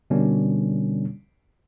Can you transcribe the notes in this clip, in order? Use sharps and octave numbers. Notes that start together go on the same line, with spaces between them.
B2 D3 G3 A#3 C#4 D4